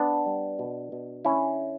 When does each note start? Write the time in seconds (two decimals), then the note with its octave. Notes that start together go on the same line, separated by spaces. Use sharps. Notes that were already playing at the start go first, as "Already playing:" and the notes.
Already playing: B3 D4
0.26 G3
0.59 B2
0.92 B2
1.25 D3 C#4 E4